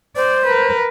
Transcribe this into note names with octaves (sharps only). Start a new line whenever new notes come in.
C5 D5
A#4 B4